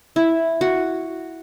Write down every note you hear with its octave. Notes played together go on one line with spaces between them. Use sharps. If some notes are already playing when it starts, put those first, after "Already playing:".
E4
F#4